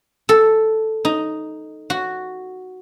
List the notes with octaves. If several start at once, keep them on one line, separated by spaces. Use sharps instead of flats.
A4
D#4
F#4